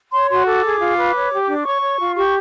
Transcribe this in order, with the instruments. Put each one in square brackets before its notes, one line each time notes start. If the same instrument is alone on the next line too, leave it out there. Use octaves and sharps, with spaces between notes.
[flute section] C#5 C6
F#4 C6
A4 D6
G#4
F4
B4
C#5
G4
D4
C#5 C#6
C#5
F4
G4 C#6